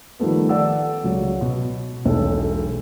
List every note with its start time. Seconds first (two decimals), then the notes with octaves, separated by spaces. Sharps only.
0.19 D#3 F3 G3 A3 B3
0.49 A4 D5 F#5 E6
1.04 C#2 F#3
1.41 B2
2.05 E1 B1 A4